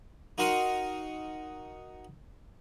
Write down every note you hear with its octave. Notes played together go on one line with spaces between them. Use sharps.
D#4 F#4 A#4 F#5 C6 D#6